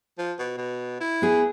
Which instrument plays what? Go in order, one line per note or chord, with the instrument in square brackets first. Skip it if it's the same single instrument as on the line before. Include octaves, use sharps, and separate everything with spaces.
[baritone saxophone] F3
B2
B2
E4
[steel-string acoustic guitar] B3 G#4